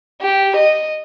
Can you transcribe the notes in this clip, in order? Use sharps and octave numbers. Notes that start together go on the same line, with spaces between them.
G4
D#5